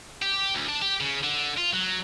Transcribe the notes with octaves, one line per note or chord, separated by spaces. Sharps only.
G4
D2
D4
G4
C#3
D3
F4
F#3